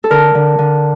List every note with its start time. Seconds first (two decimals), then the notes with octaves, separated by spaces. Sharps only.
0.04 A4
0.10 D3 A#4
0.35 D3
0.59 D3